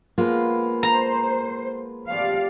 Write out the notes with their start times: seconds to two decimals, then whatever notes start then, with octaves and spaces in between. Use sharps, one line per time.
0.18 F3 G#3 A#3 B3 F4 B4
0.83 C5 A#5
2.09 C3 F3 A3 D5 F5